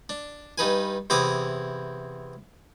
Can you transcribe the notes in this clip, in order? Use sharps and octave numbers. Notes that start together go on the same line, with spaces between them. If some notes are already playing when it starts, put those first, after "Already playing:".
D4
G2 D#4 B4 G#5
E2 C3 E4 A#5 D6 D#6